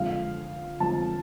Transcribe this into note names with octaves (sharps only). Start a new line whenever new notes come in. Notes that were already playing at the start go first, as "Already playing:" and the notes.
Already playing: F2 D3 G#3 F5
F2 D3 G#3 A5